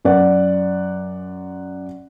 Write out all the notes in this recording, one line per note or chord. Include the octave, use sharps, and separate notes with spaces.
F#2 D5 F#5